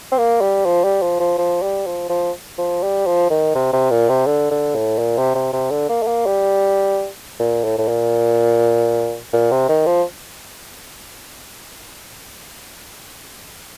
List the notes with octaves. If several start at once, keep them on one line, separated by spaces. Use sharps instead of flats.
C4
A#3
G3
F3
G3
F3
F3
F3
G3
F3
F3
F3
G3
F3
D#3
C3
C3
A#2
C3
D3
D3
A2
A#2
C3
C3
C3
D3
A#3
A3
A#3
G3
A#2
A2
A2
A#2
A#2
C3
D#3
F3